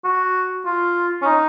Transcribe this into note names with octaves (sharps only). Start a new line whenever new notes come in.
F#4
F4
C#4
D#4